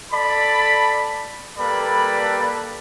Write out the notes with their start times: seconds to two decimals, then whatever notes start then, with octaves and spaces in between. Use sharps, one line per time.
0.12 A4 D5 A5 B5
1.58 G3 A#3 A4 B4 D5 B5